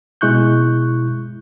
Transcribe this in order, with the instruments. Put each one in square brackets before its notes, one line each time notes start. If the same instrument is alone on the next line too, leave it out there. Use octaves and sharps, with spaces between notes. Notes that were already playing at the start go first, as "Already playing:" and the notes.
[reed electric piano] B2 G#3 E4 C#6 F#6 G6